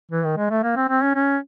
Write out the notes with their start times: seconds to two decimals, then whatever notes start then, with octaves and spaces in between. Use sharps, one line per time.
0.11 E3
0.25 D#3
0.37 G#3
0.50 A3
0.63 A#3
0.76 C4
0.89 C4
1.03 C#4
1.15 C#4